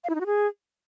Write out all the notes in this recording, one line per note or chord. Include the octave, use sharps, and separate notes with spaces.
F5
E4
D#4
F#4
G#4